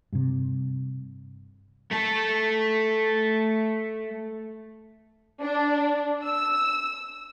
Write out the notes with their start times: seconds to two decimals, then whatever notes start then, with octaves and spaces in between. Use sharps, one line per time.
0.12 G2 C3
1.92 A3 A4
5.41 D4
6.24 E6